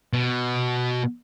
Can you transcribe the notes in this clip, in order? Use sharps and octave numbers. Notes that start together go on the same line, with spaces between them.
B2